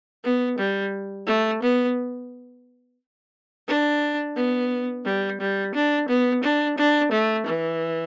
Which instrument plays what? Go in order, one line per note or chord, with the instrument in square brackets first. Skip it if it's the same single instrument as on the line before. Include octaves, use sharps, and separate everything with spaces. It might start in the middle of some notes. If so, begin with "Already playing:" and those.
[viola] B3
G3
A3
B3
D4
B3
G3
G3
D4
B3
D4
D4
A3
E3